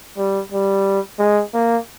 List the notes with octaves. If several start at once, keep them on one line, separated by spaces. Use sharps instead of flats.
G3
G3
G#3
A#3